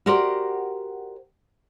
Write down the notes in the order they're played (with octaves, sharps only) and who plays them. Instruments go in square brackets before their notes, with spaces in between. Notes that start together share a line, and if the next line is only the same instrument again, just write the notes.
[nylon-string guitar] F#4 G4 A#4 C5 D5